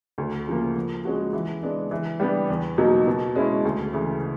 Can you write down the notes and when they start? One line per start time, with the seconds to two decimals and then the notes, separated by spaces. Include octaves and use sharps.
0.18 D2
0.47 C#3 F3 A#3
0.76 F3
1.05 G#3 C#4 F#4
1.33 E3
1.63 G#3 B3 D4
1.91 E3
2.20 G3 B3 D4 G4
2.50 E2
2.78 B2 F#3 A#3 D#4
3.07 B2
3.35 G#3 C#4 E4
3.65 D2
3.93 C#3 E3 A3